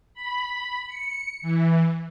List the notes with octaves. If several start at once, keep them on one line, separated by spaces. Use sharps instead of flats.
B5
C#7
E3